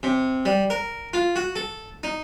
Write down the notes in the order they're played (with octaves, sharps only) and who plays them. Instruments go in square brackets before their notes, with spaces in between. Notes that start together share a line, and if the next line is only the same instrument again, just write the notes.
[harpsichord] C3
G3
A#4
F4
F#4
A4
D#4